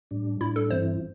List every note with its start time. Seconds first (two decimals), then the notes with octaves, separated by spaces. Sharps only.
0.11 A2 G3 D4
0.41 A2 G3 D4 E4
0.56 A4
0.71 G2 E3 C4 E4 C5